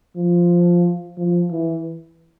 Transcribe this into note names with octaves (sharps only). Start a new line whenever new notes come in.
F3
F3
E3